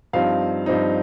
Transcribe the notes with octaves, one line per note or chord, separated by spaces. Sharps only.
G2 F3 C4 D#4 F5
G2 F3 C4 D#4